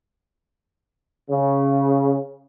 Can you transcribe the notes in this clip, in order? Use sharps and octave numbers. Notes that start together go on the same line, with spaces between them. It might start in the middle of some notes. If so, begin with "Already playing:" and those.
C#3